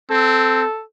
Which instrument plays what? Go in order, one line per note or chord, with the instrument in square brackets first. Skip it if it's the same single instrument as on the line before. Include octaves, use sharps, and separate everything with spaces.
[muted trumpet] C4 [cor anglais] A4